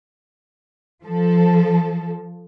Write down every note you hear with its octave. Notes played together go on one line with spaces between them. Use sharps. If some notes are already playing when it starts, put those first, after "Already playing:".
F3 A4